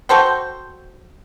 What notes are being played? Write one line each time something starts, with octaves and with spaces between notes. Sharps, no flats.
F#4 A4 C5 G5